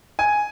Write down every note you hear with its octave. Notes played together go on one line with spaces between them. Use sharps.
G#5